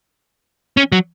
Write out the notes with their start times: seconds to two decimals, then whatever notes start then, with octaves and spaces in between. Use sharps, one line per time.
0.77 C#4
0.92 F#3